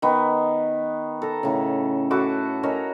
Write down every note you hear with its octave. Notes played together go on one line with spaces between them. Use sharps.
D#3 B3
A4 A#5
A2 C#3
E4 F#4 A4 D6
C#4 A#4 C#5 D#5